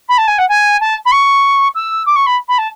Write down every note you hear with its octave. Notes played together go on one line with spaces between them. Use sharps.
B5
A5
G#5
F#5
G#5
A5
B5
C#6
E6
D6
C#6
B5
B5
A5